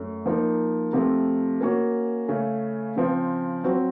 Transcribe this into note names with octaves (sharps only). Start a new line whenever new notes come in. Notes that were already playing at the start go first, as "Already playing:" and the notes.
Already playing: F#2 A3
F3 A#3 D#4
C3 F3 A3
A#3 C#4 F#4
C#3 A3 C#4
C#3 F3 C4
F#3 C4 F#4